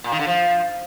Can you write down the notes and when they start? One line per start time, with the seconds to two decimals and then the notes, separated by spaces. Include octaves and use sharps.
0.04 A#2
0.12 D#3
0.19 D3
0.27 F3